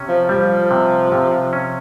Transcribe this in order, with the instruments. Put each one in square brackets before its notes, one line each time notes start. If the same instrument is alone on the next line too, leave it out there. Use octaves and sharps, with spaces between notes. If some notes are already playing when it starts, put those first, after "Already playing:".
Already playing: [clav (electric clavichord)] C3 C#4
[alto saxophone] F3
[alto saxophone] F3 [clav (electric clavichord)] G3
[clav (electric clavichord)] C3
C3
C#4